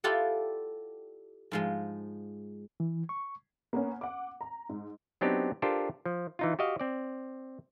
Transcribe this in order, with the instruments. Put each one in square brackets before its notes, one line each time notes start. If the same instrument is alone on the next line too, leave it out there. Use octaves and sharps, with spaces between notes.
[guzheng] E4 F4 G4 A4 D5 F#5
G#2 F3 G#3
[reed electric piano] E3
C#6
[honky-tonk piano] A#3 B3 C#4
F#5 D6
A#5
G#2
[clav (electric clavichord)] F#3 B3 C4 D4 D#4 G4
D4 F4 G4 A4 A#4 C5
F3
E3 D#4 F4
F#4 G4 D#5 F5
C4 D5